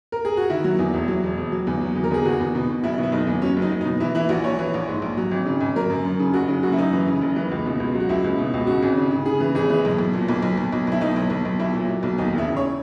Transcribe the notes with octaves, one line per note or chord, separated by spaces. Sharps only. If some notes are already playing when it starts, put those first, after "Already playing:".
A#4
G#4
F#4
D#3 E4
F#3
E2
E1
F#3
E1
E1
F#3
E2
F#3
E2
A#4
E2 G#4
E2 F#4
E2
B2
B2
F#1 E4
B2
E4
F#1 D#4
E2
F#3 C#4
F#1
D#4
F#3
D#4
B2
E3 E4
E3 E4
A#1 F#4
A#1 C#5
E3
A#1
G#2
A#1
F#3
G#1
C#3
G#1
F#3 A#4
F#2
F#2
C#3
F#1 F#4
C#3
F#2 F#4
E4
F#2 D#4
E3
C#3
F#1
E3
C#2
B2
C#2
F#3
F#4
C#2 E4
C#2
B2
C#2
C#3 F#4
G#1
C#3
C#3
C#3 G#4
E3
G#1 G#4
E3
B1
B1
A#2
B1
B1
B1
B1
B1 E4
B1 D#4
B1
B1
B1
B1 E4
A#2
F#3
B1
D#2 D#4
E1
E4
C#3
C#5